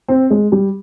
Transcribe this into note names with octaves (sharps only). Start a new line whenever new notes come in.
C4
G#3
G3